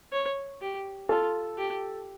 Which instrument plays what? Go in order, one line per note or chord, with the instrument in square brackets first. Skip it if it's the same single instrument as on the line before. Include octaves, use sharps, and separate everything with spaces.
[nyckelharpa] C#5
G4
[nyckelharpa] F4 [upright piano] A4
[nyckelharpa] G4